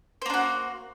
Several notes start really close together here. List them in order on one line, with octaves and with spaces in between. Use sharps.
C5 A#3 D4 F#4